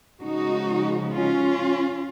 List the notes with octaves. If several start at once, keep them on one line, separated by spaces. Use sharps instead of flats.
C#3 F3 G#3 D#4 F#4
C#4 F4